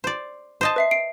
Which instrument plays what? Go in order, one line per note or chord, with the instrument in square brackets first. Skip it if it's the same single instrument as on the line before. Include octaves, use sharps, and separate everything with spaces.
[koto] C5 D5
C5 D#5 A5
[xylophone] B4 E5 C7
C7 D7